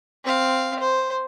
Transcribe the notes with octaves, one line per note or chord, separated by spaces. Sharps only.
C4 F5
C5